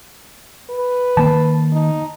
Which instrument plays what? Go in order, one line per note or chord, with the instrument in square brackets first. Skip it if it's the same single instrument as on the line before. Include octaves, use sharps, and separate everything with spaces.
[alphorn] B4
[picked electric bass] D#3 A#3 [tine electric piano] A5
[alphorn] D#4